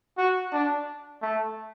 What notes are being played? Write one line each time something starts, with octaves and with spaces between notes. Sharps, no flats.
F#4
D4
A3